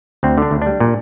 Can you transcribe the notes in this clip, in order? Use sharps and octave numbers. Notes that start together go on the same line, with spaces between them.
D2 C4
D3 D4
D2
G3 D4
A#2